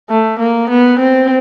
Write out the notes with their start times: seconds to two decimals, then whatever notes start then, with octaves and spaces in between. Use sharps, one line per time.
0.10 A3
0.40 A#3
0.70 B3
1.00 C4